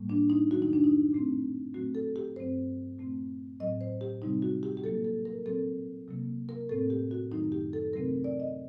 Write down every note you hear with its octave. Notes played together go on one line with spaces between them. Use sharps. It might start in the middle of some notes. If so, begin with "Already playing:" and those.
Already playing: A2 G3 A#3
D4
D#4
F#2 D#3 F#3 A3 F#4
D#4
D4
D#4
A#2 A3 C4
A#2 F#3 A3 C4 F#4
A4
G4
G2 F#3 C4 C5
A#2 A3 C4
A2 F#3 C4 D#5
C5
G4
C3 G3 C4 D#4
F#4
G4
G4
A#2 F#3 A#3 A4
A4
A#4
A#2 F#3 C4 A4
C3 F#3 A#3
A#4
A2 A3 C4 A4
G4
F#4
F#2 D#3 F#3 A3 D#4
G4
A4
C3 F#3 A3 C4 A#4
D5
D#5